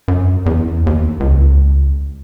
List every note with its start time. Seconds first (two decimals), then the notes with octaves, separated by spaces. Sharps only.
0.08 F#2
0.46 E2
0.86 D#2
1.20 C#2